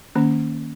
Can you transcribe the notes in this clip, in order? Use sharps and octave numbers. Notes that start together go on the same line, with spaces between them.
D#3 A#3 C#4